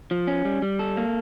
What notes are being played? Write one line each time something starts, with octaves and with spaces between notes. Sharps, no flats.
F3
C#4
G3
G3
A4
A#3